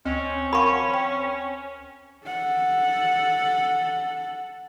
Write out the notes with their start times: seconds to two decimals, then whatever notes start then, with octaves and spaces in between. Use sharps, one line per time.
0.05 D2 C4 C#4
0.53 A#4 F5 F#5 B5 C#6
0.94 G5
2.26 A4 F#5